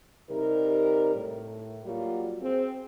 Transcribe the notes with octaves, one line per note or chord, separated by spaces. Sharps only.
C3 G3 D#4 A#4
A2
F#3 G3 A#3 F4 F#4
C4 G#4